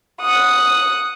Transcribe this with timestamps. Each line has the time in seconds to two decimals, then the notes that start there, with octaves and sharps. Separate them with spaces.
0.20 F#5 D#6